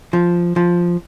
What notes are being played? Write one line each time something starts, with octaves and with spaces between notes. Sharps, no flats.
F3
F3